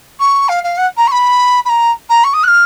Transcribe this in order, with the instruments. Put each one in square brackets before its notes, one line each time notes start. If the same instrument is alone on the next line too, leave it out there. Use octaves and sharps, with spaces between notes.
[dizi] C#6
F5
F5
F#5
A#5
C#6
B5
B5
A#5
A#5
C#6
D#6
F#6
F6